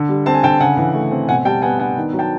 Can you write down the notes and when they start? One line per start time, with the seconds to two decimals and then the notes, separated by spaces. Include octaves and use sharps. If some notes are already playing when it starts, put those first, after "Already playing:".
Already playing: D3
0.09 G3
0.26 C4 A5
0.34 G#5
0.43 D3 G5 A5
0.60 C#3 F#5 G#5
0.77 E3
0.94 A3
1.11 C4
1.29 B2 F#5 G#5
1.45 G3 G5 A5
1.62 B3 F#5 G#5
1.79 D4 F#5 G#5
1.97 D#3
2.13 F#3
2.19 G5 A5